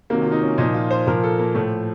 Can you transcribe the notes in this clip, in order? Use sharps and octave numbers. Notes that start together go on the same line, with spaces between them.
C3 D#3 F#3 A#3
F4
D#4
C#4
A#2 F3 D#4
F4
C5
A#2 F3 A#4
A4
A#3
A2 F3 A3